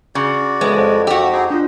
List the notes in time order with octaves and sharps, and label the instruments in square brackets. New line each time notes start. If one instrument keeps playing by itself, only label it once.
[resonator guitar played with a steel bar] C#3 [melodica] F#4 D5
[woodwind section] A2 B3 [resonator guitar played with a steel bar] G#3
[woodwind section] F2
[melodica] A#3 E6 [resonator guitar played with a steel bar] F#4 G4
[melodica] C4 D#4 G#4
[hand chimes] D4 F4 [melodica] C5 D#5